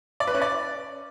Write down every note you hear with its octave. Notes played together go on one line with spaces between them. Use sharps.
D5
B4
C#4
D5